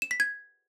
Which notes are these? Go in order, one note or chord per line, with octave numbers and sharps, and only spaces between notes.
E7
B6
G#6